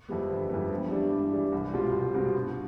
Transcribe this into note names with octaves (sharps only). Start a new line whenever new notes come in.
F2 E3 G3 B3
G1
F2 E3 G3 B3
G2
E3 G3 D4
G2
E3 G3 D4
C2
B2 G3 C4 F4
C2
B2 G3 C4 F4
G2